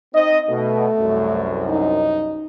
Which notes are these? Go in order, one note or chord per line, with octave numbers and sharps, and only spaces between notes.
C4 D#4 D#5
B2 A3
C2 F#2
D#4